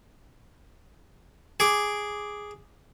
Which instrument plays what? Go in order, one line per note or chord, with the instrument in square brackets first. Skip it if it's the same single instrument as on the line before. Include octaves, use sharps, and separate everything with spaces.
[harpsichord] G#4 D6